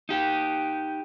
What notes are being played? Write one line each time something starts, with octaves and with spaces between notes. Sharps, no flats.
D#4 G4